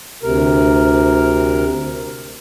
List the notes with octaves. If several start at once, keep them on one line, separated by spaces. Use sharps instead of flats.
D2 C3 A#4